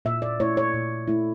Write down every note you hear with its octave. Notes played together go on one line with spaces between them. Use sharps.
A#2 E5
D5
A3 E4 C#5
C#5
A#2
A3 E4